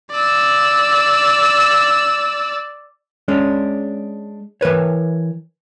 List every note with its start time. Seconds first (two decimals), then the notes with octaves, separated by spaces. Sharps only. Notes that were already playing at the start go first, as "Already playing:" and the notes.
0.11 D5 E6
3.28 G#3 C#4 D4
4.61 E3 A#4 B4 C#5